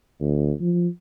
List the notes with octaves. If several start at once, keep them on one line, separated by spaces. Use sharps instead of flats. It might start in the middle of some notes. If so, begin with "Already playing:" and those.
D2
F3